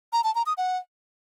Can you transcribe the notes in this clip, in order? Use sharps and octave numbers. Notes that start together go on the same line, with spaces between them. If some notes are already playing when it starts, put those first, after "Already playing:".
A#5
A5
A#5
D#6
F#5